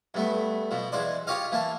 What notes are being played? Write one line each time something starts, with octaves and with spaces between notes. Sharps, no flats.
G2 A3 B3
B2 F3
E2 G#3 C5 D5
F4 G4 C#5 D#5 F5
E3 A#3 A5